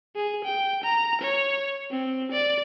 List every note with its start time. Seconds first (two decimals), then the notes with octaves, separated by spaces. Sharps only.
0.16 G#4
0.45 G5
0.84 A#5
1.22 C#5
1.91 C4
2.32 D5